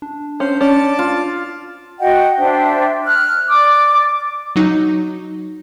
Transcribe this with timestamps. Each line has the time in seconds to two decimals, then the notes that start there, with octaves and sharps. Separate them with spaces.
0.02 D4
0.40 C#4 C5
0.61 C#4 D5 A5
0.99 F4
1.99 F#4 D#5 F#5 G5
2.38 D4 C5 E5 G5
3.05 F6 F#6
3.49 D5 D6
4.56 F#3 D#4